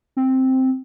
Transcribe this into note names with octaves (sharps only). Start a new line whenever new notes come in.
C4